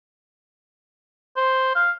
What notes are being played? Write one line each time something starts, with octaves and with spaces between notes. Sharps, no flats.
C5
F5